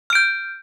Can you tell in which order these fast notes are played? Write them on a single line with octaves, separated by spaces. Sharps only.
F6 D7 G6